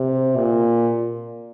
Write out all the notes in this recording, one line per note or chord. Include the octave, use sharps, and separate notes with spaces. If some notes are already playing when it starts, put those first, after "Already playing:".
Already playing: C3
A#2